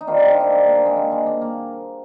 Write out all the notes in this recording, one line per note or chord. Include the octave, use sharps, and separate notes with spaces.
D#4
C3 D#3 G3 D4 F4
D#4 G4
D4 F4
C4 D#4
A#3 D4
A#3
A#3
G#3 C4
A#3
G#3
A#3
A#3